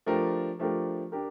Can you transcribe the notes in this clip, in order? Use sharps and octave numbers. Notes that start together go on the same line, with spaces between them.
F3 A3 D4 G4 A#4
F3 A3 D4 G4 A#4
D4 G4 A#4